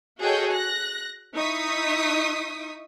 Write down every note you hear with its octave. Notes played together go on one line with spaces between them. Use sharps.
F#4 G#4 A4 C#5 D#5 G5
F#6 A#6
D#4 E4 C#6 D#6 B6